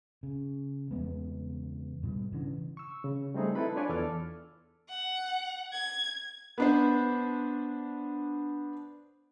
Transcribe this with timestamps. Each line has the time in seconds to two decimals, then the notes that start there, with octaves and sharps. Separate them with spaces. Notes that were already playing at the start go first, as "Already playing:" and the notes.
0.23 C#3
0.91 E2 C#3 G#3 B3
2.03 G#2 B2 G3
2.32 C#3 E3 C#4 D4
2.77 C#6 E6
3.04 C#3
3.34 G3 A3 C4 D#4 G#4
3.55 E4 A4 B4 B5 C6
3.76 D4 F4 B4 C#5 D5 G#5
3.89 E2 A4 D6 F6
4.90 F#5
5.73 G#6
6.58 B3 D4 C5